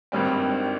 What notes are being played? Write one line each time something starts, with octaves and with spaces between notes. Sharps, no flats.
G#1 G2 D#3 G3 C4